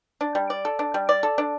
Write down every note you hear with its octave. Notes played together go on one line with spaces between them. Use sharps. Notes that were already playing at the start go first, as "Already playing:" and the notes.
D4
G3
D5
A4
D4
G3
D5
A4
D4